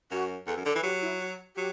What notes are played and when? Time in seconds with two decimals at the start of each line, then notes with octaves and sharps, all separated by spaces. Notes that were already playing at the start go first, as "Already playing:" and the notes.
0.11 F#2 F#4
0.47 E2 A4
0.56 F#2
0.65 D3 A4
0.75 E3
0.83 F#3 G4
1.02 E4
1.20 F#4
1.56 F#3 G4